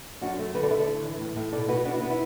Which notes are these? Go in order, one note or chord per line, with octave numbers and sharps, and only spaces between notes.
F#2 D4 F#4
A3
D3 F#4 B4
A4 D5
D3 B4 E5
A4 D5
A2
E3
A2
A2
B2 A4 D5
B2 F#4 B4
B3 D4 F#4
E4
B3 D4
E4